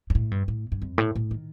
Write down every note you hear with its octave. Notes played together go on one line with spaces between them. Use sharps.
G2
A2
G2
A2
G2
F2
A2
A2
D#3